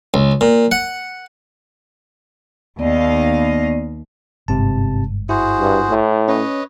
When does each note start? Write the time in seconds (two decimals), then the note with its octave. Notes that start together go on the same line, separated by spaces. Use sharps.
0.14 C#2
0.41 A#2
0.72 F#5
2.79 D#2 B3 D5 D#5 F5
4.48 G1 G#2 C3 A5
5.29 E4 F#4 G#4 C5
5.60 G2
5.90 A2
6.28 C#4 B4 C#5 D#5